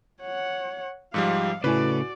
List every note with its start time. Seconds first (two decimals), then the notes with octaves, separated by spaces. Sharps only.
0.22 C#5 F#5
1.14 G#2 F3 G3 F5 D#6 E6 C#7
1.64 A2 C#3 A3 E4 F#4 B4 D5 G#5